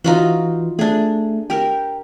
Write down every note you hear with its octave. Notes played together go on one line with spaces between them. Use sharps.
E3 D#4 F4 F#4
A3 D4 G#4
G4 A#4 G5